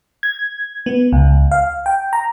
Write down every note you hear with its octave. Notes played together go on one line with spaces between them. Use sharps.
G#6
B3
C#2
F5
G5
A#5